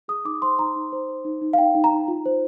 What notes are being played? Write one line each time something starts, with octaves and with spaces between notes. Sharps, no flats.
G#4 D#6
D#4 D6
C5 C6
D#4 A#5
D#4
C5
C5
D#4
D#4
F5
D#4 G5
D#4
A#5
D#4
F4
C5